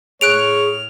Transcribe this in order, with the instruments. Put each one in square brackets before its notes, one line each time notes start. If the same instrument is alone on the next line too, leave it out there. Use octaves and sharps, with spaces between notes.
[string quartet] A2 F6 [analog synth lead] G#4 [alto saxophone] C#5 [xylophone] F#6 D7 F7